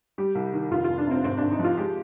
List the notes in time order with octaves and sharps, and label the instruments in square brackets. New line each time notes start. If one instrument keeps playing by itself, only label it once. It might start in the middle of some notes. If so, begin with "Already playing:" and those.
[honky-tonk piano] G3 G4
C2
D#3
F1 F4
F4
F1
D4
C3 C4
G#1 C4
G#1 D4
D#4
F3
F4
G#3 G4